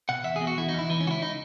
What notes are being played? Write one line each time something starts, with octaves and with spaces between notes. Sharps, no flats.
B2 F#5
E2 E5
G#4
B2
F#4
E2 E4
D#4
E2
E4
E3 D#4
C#4
C#2 F#4
E4
D#4